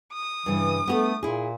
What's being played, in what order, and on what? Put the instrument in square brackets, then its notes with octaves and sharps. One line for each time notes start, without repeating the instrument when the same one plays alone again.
[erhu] D#6
[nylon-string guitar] G2 C#3 [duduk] E3
[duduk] A3 [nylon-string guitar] B3 G4 A4
[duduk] A#2 [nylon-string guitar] E4 G#4